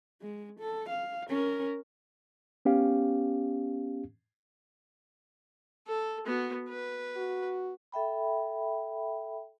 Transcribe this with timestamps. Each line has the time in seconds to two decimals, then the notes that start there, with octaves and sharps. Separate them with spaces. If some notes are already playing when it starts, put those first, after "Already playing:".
0.22 G#3
0.59 A4
0.89 F5
1.29 C#4 A#4
2.65 B3 C#4 G4 F5
5.87 A4
6.26 B3 F#4
6.69 B4
7.17 F#4
7.92 A4 E5 G5 B5